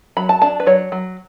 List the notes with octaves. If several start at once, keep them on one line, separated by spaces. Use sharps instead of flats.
F#3 B5
A5
D4 A5
B4
F#3 C#5
F#3